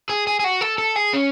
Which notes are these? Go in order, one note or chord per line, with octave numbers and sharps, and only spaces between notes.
G#4
G#4
G#4
F#4
A4
A4
G#4
C#4